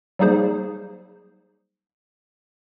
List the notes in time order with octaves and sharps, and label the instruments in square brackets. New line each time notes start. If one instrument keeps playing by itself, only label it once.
[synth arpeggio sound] F#3 G3 A#3 D#4 G#4 C5